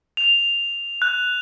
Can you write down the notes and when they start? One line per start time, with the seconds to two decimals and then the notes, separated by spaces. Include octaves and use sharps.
0.17 F7
1.02 F#6